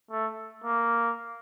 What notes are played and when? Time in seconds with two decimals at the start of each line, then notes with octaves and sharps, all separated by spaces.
0.11 A3
0.64 A#3